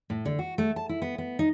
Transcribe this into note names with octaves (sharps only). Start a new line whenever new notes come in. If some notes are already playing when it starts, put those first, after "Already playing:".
A2
D3
F#4
A3
A5
E4
B3
B3
D#4